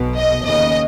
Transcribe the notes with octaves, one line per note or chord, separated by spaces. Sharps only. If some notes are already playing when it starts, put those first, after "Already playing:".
Already playing: B1 B2
D#5
D#2 C#3 D#5